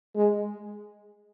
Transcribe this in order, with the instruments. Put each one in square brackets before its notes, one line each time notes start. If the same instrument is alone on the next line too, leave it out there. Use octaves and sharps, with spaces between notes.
[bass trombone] G#3